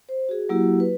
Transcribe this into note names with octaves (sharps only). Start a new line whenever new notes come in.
C5
F#4 G#4
F#3 A#3 E4 F#4 G4
B4